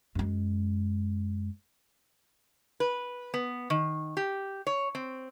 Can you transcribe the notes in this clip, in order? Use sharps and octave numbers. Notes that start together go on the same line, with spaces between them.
F#2 G#3
B4
B3
D#3
G4
C#5
C4